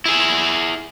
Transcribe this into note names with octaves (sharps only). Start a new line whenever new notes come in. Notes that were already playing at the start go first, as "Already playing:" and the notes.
E4 G#4